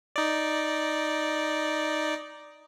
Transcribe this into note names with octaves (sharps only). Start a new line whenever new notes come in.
D#4 D5